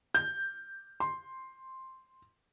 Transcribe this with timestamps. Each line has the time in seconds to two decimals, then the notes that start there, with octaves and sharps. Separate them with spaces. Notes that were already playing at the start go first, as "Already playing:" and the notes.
0.15 G6
1.00 C6